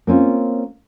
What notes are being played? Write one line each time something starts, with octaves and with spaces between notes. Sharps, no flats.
A#3 C4 C#4 F4